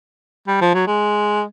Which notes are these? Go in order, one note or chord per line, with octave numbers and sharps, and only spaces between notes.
G3
F3
F#3
G#3